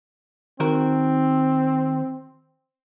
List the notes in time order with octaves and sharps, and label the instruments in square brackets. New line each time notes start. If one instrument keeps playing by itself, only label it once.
[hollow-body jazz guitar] D#3 F#4 A#4 [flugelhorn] C4